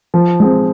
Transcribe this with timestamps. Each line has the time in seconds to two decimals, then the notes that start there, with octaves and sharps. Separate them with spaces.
0.14 F3
0.40 G#3 C4